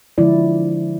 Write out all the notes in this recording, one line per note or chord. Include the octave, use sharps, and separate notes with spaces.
D3 F3 G#3 E4 D5